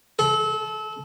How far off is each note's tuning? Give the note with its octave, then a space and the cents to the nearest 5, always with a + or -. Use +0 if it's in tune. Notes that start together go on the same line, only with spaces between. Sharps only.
A4 -30